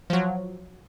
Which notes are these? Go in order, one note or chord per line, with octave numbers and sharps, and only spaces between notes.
F3 F#3